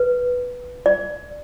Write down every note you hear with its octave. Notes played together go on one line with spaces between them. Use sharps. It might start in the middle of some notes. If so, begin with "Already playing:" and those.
Already playing: B4
D5